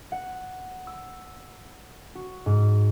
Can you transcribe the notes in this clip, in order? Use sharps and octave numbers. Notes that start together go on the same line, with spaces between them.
F#5
E6
F#4
G#2